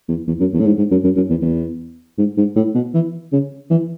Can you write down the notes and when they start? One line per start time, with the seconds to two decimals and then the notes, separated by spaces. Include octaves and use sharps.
0.09 E2
0.27 E2
0.40 F#2
0.54 E2
0.60 A2
0.66 G#2
0.78 G#2
0.91 F#2
1.04 F#2
1.16 F#2
1.30 E2
1.42 E2
2.18 G#2
2.37 G#2
2.56 A2
2.75 B2
2.94 E3
3.32 C#3
3.71 E3